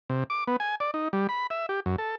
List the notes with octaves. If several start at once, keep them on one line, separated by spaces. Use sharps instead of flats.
C3
D6
B3
G#5
D5
D#4
G3
B5
E5
G4
F#2
A4